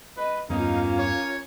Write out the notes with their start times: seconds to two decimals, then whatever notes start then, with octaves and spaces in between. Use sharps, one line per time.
0.17 B4 D#5
0.50 E2 G2 A#3 B3 C#4 D#4 F4 F5
0.98 C#5